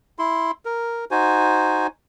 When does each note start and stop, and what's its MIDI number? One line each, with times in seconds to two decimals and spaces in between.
0.19 0.51 64
0.19 0.51 84
0.65 1.05 70
1.11 1.87 63
1.11 1.87 66
1.11 1.87 72
1.11 1.87 80